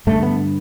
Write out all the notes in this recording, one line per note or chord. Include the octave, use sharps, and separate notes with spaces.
G2 D3 A3
B3